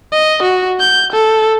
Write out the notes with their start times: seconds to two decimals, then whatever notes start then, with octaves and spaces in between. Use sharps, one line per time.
0.12 D#5
0.43 F#4
0.80 G6
1.12 A4